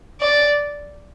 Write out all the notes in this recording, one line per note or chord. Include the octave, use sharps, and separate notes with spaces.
D5